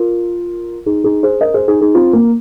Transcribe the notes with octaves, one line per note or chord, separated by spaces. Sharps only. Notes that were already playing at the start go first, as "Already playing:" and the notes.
Already playing: F4 A#4
D#4 G#4
D#4 G#4
G#4 C5
A#4 D#5
G#4 C5
D#4 G#4
D#4 G#4
C4 F4
A#3